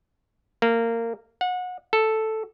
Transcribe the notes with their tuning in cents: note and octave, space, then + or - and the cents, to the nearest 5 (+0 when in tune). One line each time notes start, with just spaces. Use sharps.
A#3 -20
F#5 -30
A4 +0